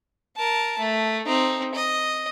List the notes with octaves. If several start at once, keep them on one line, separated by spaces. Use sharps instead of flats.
A#4 A5
A3
C4 D#4
D#5